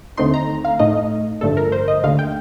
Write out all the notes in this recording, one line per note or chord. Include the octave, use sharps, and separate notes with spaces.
D#2 D3 A3 C4 D#4 C6
A#5
F5
A2 A3 D#4 D#5
A1 G2 D3 F3 A3 A4
A#4
C5
D#5
D#2 D3 A3 F5
G5